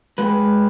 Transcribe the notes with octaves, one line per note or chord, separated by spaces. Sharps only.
G#3 B4